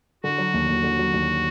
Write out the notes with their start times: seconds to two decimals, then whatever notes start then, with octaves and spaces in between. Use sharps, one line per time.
0.24 D3 F#4
0.38 F#3
0.54 D#2
0.68 D#2
0.84 D3
0.99 F#3
1.14 D#2